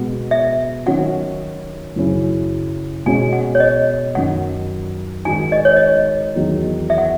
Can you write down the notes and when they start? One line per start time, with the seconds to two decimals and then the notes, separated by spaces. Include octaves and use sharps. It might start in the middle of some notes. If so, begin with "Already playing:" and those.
Already playing: B2 G#3 B3 F#4
0.31 E5
0.86 D#3 F#3 C#4 F#4 F#5
1.96 F#2 C#3 F#3 C#4 E4
3.06 B2 G#3 C#4 G#5
3.33 F#5
3.55 C#5
3.60 D#5
4.15 F#2 D#3 F#3 F#5
5.25 G#2 D#3 G#3 D#4 F#4 G#5
5.52 D#5
5.65 C#5
5.77 D#5
6.35 E2 D#3 F#3
6.90 E5
6.98 F#5